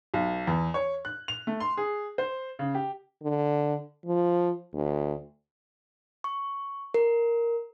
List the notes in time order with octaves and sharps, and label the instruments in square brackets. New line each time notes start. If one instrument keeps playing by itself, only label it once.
[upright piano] B1
E2
C#5
F#6
F7
A3
C6
G#4
C5
C#3
G4
[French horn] D3
F3
D2
[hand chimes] C#6
A#4